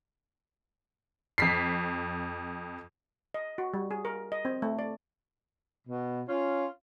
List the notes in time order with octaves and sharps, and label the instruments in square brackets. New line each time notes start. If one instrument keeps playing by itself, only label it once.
[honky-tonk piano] F2 B6 C7
[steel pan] D#5
F#4
G3
G#4
A#4
D#5
C4
A3
D5
[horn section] B2
C#4 F4